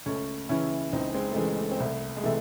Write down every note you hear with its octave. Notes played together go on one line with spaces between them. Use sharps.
C#2 A3 C#4
C#3 E3 C#4 E4
C#2 C4 D#4
G#3 C4
A3
C#3 E3 G#3
A3
C4
C2 A3
G#3
C3 E3 A3